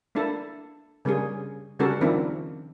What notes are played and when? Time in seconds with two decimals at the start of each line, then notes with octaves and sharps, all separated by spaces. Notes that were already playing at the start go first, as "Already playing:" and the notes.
0.15 A#3 D4 E4 A4
1.05 C#3 G3 A#3 C#4 G#4
1.79 C#3 G3 C#4 F#4 A4 A#4
2.01 D#3 F3 A#3 C4 D4 E4